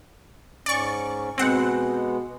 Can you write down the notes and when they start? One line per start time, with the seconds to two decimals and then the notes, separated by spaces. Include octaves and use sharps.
0.66 G#2 C#4 D5 C#6
1.38 B2 G#3 B3 C4 F#5